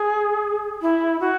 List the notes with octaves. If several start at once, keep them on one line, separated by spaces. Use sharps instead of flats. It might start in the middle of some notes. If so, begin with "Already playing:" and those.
Already playing: G#4
E4
F#4